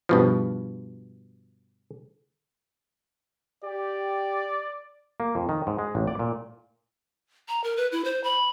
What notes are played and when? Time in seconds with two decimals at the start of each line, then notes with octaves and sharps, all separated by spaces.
0.09 G2 B2 F3
3.64 G4 D5
5.20 A#3
5.35 F2
5.49 D#3
5.67 G#2
5.79 G#3
5.95 A1
6.07 D5
6.19 A#2
7.48 A#5
7.64 A#4
7.77 B4
7.92 E4
8.05 C5
8.24 B5